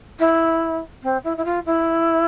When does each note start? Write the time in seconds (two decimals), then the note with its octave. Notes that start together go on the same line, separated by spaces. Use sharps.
0.19 E4
1.03 C4
1.24 E4
1.37 E4
1.45 F4
1.66 E4